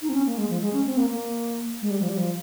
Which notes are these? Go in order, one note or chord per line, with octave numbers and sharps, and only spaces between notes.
D#4
C4
C#4
A#3
G#3
F3
G#3
C#4
C4
A#3
A#3
G#3
G3
F3
G3
F3